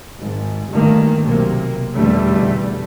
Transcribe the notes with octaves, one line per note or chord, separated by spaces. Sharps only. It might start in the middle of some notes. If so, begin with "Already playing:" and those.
G#1 G#2
G1 G2 D#3 A3 A#3
B1 C3 A#3
F1 E2 B2 D3 G3 A3